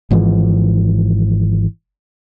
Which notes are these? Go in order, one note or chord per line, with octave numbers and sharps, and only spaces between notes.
G#1 G#2 E3 F3